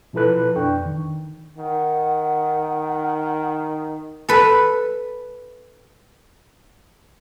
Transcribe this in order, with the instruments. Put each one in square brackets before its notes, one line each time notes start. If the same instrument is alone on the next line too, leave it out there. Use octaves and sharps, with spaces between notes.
[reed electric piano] B2 F3 E4 A4 B4 F#6
F2 D4 G5 C#6
D#3
[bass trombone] D#3 [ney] F#5
[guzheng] A4 B4